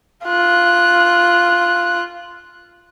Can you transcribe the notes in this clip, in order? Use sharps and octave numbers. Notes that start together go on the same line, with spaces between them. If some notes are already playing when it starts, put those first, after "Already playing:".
F4 F#6